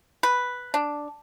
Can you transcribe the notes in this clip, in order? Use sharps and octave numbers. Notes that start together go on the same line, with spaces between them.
B4
D4